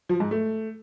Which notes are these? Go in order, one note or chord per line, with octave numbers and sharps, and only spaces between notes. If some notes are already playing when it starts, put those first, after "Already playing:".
F3
G#2
A3